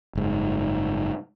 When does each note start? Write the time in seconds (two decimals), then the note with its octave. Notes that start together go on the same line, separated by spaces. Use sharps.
0.15 F#1 G#2